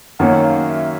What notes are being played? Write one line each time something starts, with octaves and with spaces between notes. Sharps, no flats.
F#2 D#3 F#3 A#3 C#4 F#5
F5
E5